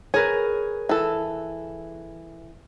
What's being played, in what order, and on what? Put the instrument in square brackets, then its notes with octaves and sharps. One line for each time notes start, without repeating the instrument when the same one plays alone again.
[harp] G#4 A#4 B4 [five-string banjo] C#5
[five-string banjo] E3 A4